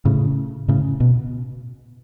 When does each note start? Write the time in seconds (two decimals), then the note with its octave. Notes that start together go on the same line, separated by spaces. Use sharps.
0.05 A2 C#3
0.68 A2 C#3
1.00 B2